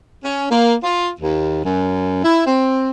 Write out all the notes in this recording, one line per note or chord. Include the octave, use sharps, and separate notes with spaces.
C#4
A#3
F4
D#2
F#2
E4
C4